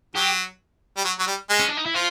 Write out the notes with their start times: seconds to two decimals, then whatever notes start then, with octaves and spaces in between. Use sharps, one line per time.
0.16 F#3 G4
0.97 G3
1.05 F#3
1.19 F#3
1.27 G3
1.50 G#3
1.59 C#4
1.68 D4
1.77 D#4
1.86 E4
1.94 F3 F4